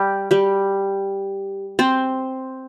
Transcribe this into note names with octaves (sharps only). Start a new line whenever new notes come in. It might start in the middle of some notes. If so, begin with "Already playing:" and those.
Already playing: G3 G4
G3 G4
C4 C5